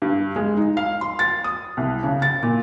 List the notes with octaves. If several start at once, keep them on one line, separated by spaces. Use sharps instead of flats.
G2
G#3
D#4
F5
C6
A6
D#6
C2
C#3
A6
A#2